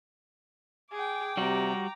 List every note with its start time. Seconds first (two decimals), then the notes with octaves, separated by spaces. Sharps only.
0.92 G#4 G5 D6
1.37 C3 G3 F#4 A#5